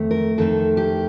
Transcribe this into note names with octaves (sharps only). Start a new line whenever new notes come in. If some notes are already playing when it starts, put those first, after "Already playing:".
Already playing: F2 D#3 A3
A#4
F2 D#3 A3 A4
G4